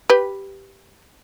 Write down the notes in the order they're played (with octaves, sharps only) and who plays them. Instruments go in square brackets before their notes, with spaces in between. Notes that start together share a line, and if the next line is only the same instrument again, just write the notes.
[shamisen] G4 B4